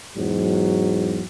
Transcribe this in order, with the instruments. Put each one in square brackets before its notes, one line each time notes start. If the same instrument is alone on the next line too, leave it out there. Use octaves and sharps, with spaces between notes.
[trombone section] E2 G#2 F#3